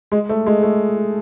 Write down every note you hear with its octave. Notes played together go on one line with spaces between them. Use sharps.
G#3
A3
G#3
A3